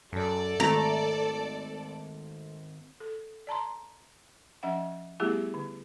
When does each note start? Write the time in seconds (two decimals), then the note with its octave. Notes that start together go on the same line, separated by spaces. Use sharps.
0.13 F#2 A4 D5
0.60 G#1 A3 A#5
3.00 A4
3.47 D5 A5 A#5 C6
4.63 F3 C#4 E5 F#5
5.20 G3 A3 B3 E4 G4 G#4
5.54 D3